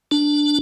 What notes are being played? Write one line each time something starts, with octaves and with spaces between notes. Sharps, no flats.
D4